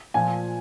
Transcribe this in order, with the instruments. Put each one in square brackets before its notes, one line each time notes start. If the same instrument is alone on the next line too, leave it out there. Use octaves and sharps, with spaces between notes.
[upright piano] A#2 F3 G#5